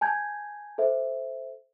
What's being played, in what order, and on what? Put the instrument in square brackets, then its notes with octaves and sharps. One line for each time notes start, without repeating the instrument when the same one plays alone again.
[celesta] G#5 A5 G6 G#6
A4 C5 E5